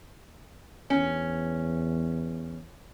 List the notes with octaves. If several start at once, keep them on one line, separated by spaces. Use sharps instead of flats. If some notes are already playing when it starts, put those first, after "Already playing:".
E2 C#4